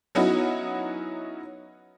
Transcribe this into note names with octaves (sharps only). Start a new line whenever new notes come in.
F#3 B3 C#4 D#4 E4 F#4